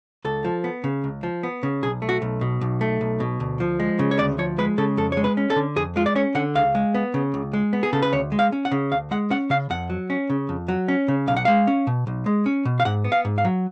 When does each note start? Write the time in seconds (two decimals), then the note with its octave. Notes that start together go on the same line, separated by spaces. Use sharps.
0.25 C#2 A4
0.45 F3
0.64 B3
0.84 C#3
1.04 C#2
1.23 F3
1.43 B3
1.63 C#3
1.83 B1 G#4
2.02 A3
2.09 F#4
2.22 B1
2.41 B2
2.61 B1
2.81 A3
3.01 B1
3.20 B2
3.40 D2
3.60 F3
3.80 G#3
3.99 C#3
4.11 C#5
4.19 D2 D5
4.38 F3 C#5
4.58 G#3 B4
4.78 C#3 A4
4.97 F2 A4
5.12 G#3 C#5
5.24 B4
5.37 C#4
5.50 A4
5.56 D3
5.76 F2 G#4
5.96 G#3 F4
6.06 D5
6.15 C#4 C#5
6.35 D3 F#5
6.55 C#2 F5
6.75 G#3
6.94 B3
7.14 C#3
7.34 C#2
7.53 G#3
7.73 B3
7.83 G#4
7.93 C#3 A4
8.02 B4
8.12 D2 C#5
8.32 G#3
8.39 F5
8.52 C#4
8.65 F#5
8.71 C#3
8.92 D2 F5
9.11 G#3 F#5
9.31 C#4 F#5
9.50 C#3 F5
9.70 F2 F#5
9.90 F#3
10.10 C#4
10.30 C#3
10.49 F2
10.68 F#3
10.88 C#4
11.08 C#3
11.27 B1 F5
11.37 F#5
11.45 G#3 F5
11.67 C#4
11.87 B2
12.07 B1
12.26 G#3
12.46 C#4
12.65 B2
12.80 F5
12.85 G#2 F#5
13.04 B3
13.12 F5
13.25 G#2
13.38 F5
13.45 F#3